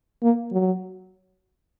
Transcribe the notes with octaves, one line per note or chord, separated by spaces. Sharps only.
A#3
F#3